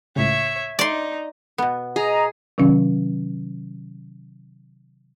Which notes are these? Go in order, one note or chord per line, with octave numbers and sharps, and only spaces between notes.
C#2 A2 C#3 C#5 E5
D#4 D5 C6
B2 B3
G#4 D#5 A#5
C3 D#3 F#3 C#4